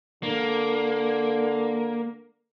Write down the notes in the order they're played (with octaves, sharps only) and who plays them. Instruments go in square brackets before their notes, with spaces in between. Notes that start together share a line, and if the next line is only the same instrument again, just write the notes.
[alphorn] D3 [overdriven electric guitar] A#3